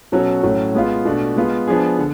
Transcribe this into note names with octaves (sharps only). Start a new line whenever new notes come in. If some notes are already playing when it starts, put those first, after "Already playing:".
B2 F#3 C#4 F#4 A4
A2 F#3 C#4
G#3 B3 F4
B2 A3 D4
G#3 B3 F4
F3 B3 D4 G#4
D3